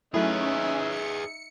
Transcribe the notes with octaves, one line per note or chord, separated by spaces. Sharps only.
F#3 A3 C#4 D#4 E4 G#4 B4 E5
C#7